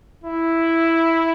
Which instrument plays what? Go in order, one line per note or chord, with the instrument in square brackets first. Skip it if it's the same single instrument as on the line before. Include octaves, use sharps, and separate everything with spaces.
[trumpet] E4